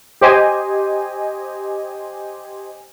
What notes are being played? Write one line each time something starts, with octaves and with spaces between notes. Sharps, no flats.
G4 C5 D#5 G#5